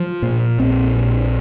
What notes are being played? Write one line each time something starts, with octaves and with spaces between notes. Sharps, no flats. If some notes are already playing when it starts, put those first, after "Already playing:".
Already playing: F3
A#2
A#1 C4
A#1